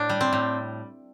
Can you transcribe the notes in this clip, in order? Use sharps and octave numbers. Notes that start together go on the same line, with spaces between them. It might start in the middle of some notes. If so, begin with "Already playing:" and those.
Already playing: A2 D4
G3
C4
A2